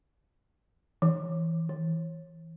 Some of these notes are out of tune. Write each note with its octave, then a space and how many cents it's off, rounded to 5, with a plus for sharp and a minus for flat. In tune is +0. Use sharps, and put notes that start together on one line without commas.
E3 -10
E3 -20